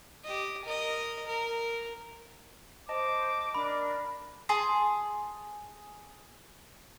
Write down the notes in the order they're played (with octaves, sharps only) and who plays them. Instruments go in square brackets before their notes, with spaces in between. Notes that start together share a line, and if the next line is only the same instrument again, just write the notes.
[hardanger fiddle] G4 D#5
A#4 D#5
A#4
[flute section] C5 [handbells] D#5 A5 [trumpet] D6
[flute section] D4 A#4 [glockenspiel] B5
[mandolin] G#4 A5 C6